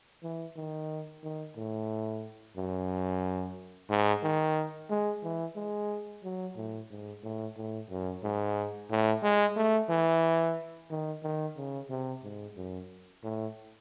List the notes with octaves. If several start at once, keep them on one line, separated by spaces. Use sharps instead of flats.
E3
D#3
D#3
A2
F#2
G#2
D#3
G#3
E3
G#3
F#3
A2
G#2
A2
A2
F#2
G#2
A2
G#3
A3
E3
D#3
D#3
C#3
C3
G#2
F#2
A2